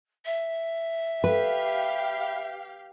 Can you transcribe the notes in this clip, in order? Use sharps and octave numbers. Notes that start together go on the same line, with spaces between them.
E5
G4 B4 F5